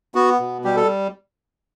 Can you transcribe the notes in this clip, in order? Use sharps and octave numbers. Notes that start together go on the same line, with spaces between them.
B3 F#4
B2
G3 G4
A4